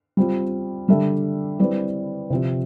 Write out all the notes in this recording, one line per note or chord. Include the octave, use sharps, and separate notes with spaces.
G3 C4 F4
D3 G3 D4 A4 E5
G3 C4 E4 B4 D5
C3 F3 C4 G4